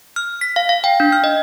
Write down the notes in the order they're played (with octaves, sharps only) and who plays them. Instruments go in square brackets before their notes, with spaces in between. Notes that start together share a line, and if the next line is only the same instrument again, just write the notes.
[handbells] F6
B6
F5
F5
G5
D4
F6
D#5